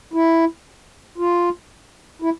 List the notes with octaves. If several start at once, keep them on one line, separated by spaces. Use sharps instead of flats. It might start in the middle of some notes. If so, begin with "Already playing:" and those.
E4
F4
E4